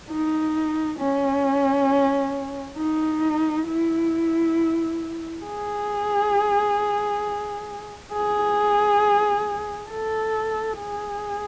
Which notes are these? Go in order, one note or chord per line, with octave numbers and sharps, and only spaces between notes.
D#4
C#4
D#4
E4
G#4
G#4
A4
G#4